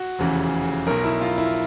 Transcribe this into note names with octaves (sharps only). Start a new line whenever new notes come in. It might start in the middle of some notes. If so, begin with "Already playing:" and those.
Already playing: F#4
F1 E2 C#3 E3
B1 B2 A#4
E4
F4
E4